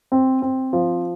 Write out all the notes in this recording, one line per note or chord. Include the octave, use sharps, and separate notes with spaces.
C4
C4
F3